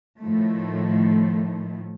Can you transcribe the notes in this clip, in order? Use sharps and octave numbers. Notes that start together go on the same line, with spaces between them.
A2 D#3 F3 A3